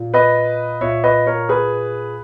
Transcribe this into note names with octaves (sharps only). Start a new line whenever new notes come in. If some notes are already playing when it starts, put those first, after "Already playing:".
Already playing: A#2
B4 D#5
A#2 C#5 E5
B4 D#5
A#4 C#5
G#4 B4